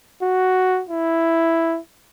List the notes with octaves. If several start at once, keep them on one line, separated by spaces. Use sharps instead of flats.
F#4
E4